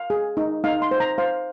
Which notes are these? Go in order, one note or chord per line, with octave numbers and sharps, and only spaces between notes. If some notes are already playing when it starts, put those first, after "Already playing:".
Already playing: F5
G#4
D#4
D#4 F5
C6
C5
A#5
C5 F5